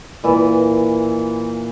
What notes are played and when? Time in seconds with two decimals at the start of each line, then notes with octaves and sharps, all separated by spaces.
0.24 A#2 E3 E5